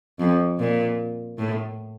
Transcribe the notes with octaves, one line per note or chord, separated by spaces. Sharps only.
F2
A#2
A2